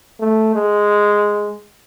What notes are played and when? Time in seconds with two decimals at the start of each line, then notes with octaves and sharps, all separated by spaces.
0.20 A3
0.55 G#3